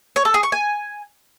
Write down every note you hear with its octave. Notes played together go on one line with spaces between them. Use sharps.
C#5
A4
G#4
C#6
G#5